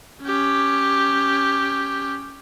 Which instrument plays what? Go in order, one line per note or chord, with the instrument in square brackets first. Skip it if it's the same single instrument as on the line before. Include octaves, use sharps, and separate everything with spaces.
[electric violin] C#4 G4